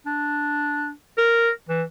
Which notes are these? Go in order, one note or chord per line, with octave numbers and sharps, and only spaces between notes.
D4
A#4
E3